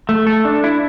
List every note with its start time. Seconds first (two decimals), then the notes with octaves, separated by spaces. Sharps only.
0.09 A3
0.27 A4
0.45 D4
0.64 E4